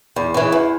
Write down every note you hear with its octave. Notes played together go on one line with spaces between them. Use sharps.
E2
C#3 E3
E2